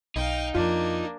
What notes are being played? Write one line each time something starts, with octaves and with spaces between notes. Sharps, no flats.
B1 D#4 F5 G5
F2 A#3 D4 F4